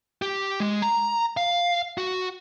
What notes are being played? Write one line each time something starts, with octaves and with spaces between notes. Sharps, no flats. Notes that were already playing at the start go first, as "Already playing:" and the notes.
G4
G#3
A#5
F5
F#4